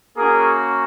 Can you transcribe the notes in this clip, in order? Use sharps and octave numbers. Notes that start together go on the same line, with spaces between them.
A#3 C#4 F#4 G#4 A#4